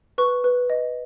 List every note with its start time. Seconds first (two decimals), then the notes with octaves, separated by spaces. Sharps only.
0.18 B4 C#6
0.44 B4
0.70 D#5